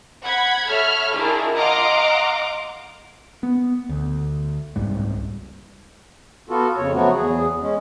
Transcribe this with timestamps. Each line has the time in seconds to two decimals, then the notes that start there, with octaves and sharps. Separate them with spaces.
0.25 F#5 B5 G#6
0.70 A4 C#5 E5 B5 F6
1.15 D#3 D4 E4 F4 G#4
1.55 D#5 F5 F#5 A#5 C6 D6
3.43 B3
3.89 D2
4.76 F#1 C2 G#2 G3
6.50 B3 F4 F#4 A4
6.77 F2 C#3 C#5
6.93 F3 F#3 A3 B3 F#4
7.14 E2 G#4
7.61 G#3 C#4